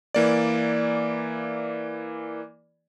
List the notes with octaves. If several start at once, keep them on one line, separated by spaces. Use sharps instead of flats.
E3 A#3 D5